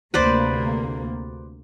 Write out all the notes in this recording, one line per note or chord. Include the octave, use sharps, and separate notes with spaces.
D2 C3 A#3 B4 C5 D5